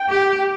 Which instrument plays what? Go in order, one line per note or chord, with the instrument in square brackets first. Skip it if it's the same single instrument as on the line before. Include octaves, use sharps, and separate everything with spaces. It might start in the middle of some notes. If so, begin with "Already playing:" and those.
Already playing: [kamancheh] G5
[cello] G4